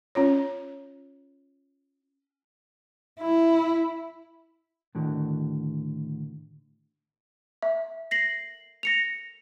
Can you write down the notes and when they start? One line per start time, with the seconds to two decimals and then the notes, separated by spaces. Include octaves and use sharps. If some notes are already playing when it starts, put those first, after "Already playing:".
0.15 C#4 F4 C#5
3.21 E4
4.95 A2 D3 D#3 F#4
7.62 E5
8.11 A#6 C7 F#7
8.83 A#6 C#7 F7